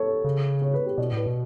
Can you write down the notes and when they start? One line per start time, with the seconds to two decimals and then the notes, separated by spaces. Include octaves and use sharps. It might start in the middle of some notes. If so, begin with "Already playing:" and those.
Already playing: A4 C#5
0.24 C#3
0.62 C#5
0.74 B4
0.86 G4
0.98 B2 D5
1.12 A2 B4
1.26 B2